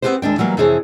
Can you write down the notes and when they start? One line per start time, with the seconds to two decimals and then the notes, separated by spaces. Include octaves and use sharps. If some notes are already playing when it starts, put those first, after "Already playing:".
0.02 B3 C4 D4 G4 B4 C5
0.22 D#2 G#3 D4 G5
0.38 E3 F#3 G3 A#3
0.57 F2 C3 E3 G#4 C5 C#5